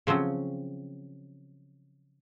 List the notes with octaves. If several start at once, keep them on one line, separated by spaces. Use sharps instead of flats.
C#3 F3 F#3 C4 C#4